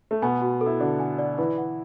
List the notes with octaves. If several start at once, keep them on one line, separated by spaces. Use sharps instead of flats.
A3
B2 B3 G#5
F#4
A4
E4
D3 D4 F#4
G#5
D5
E3 E4 B4
F#5